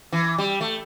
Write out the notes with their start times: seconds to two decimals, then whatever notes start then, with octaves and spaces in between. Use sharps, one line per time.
0.12 E3
0.38 G3
0.61 A3